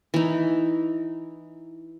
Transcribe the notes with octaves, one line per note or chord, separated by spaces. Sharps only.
E3 D#4